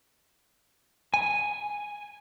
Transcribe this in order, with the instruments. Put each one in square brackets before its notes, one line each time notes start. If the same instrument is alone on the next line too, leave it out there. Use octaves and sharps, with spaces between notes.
[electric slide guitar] G#5